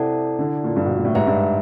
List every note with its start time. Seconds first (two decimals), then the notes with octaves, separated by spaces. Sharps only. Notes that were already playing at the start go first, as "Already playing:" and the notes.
Already playing: C3 E4 A4 D5 F#5 A5
0.39 D3
0.64 A#2
0.76 G2
0.86 B2
0.96 A#2
1.05 A2
1.15 G#2 G4 B4 E5
1.27 G2